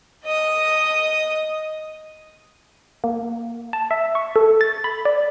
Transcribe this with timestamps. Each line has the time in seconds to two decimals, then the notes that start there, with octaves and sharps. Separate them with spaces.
0.24 D#5 D#6
3.04 A#3
3.73 A5
3.91 E5
4.15 C#6
4.36 A4
4.61 A6
4.84 B5
5.05 D5